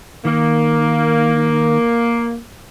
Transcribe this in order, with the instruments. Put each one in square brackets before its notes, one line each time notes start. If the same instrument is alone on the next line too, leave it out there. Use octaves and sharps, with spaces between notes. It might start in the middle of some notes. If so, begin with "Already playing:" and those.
[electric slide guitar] D#3 [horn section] A#3